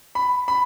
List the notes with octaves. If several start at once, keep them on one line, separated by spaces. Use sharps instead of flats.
B5
B5